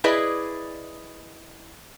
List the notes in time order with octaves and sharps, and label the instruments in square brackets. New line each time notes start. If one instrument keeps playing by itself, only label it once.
[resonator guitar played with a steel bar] E4 G#4 B4 D5 D#5